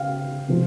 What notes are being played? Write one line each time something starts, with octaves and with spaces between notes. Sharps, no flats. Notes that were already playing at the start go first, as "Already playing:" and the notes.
Already playing: C#3 F5 G5
C3 F3 G#3